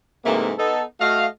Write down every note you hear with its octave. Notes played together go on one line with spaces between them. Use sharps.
G#2 C3 E3 A3 A#3
B3 D#4 A4
A3 F#4 D#5 F5